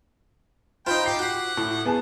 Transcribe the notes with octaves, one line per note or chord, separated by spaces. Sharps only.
D#4 F4 C5 G5 B5
G4 C7
F#4 G4 F#5
A2
B3 G#4 A5